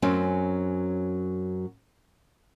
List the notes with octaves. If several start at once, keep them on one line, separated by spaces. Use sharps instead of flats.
F#2 F#3 C4 C#4